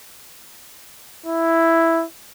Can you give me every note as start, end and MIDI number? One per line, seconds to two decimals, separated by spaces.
1.26 2.05 64